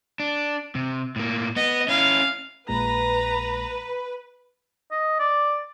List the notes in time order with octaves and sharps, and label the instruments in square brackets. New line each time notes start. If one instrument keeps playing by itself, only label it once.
[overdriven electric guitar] D4
C3
A2 A#3
[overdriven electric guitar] B3 [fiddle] D#5
[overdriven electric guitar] C#4 E4 [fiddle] F5
[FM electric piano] A#1 A#2 G#3 [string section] B4 [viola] A#5
[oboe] D#5
D5